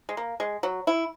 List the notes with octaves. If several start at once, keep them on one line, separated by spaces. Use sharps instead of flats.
G#3
A#3
G#3
F#3
E4